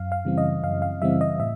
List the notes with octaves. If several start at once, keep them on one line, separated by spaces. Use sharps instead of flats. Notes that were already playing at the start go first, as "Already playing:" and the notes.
Already playing: F#2 F5
F5
C#3 E3 G3 C4
D#5
F#2 F5
F5
C#3 E3 G3 C4 E5
D#5
A2 E5